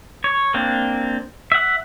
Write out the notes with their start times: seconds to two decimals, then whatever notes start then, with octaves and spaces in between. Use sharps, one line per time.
0.24 C#5
0.54 A#3 C4 D4
1.52 E5 F#5